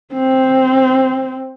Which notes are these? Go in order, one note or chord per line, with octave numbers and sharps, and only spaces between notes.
C4